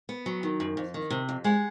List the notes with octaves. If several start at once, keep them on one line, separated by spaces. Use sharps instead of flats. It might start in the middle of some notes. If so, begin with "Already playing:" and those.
B3
F#3
D#3
F#2
F2
D#3
C3
F2
G#3 F#5